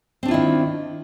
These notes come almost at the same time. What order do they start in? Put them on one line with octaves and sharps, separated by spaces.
C4 D4 F4 E4 D#3